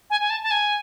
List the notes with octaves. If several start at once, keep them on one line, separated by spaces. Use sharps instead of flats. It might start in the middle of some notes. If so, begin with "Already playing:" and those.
G#5
G#5
A5
A5
G#5